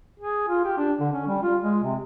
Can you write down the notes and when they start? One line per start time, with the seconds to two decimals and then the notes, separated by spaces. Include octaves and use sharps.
0.20 G#4
0.49 F4
0.65 G4
0.78 D4
1.00 D3
1.13 C#4
1.28 G3
1.43 F4
1.62 G#3
1.83 C3